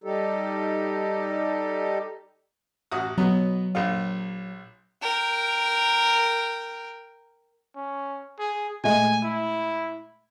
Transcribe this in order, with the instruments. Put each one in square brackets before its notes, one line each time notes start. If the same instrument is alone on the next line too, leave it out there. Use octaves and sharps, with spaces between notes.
[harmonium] G3 D#4 G4 A4
[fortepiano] A1 F#4 D#6
[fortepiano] B2 B3 [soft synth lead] F#3
[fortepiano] A#1 F4
[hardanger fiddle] A#4 G5
[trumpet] C#4
G#4
[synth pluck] A#2 G#3 A3 [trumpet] G#5
[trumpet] E4